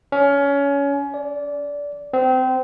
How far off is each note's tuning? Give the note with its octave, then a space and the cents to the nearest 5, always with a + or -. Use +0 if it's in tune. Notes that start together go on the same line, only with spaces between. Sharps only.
C#4 +25
D5 -20
C4 -25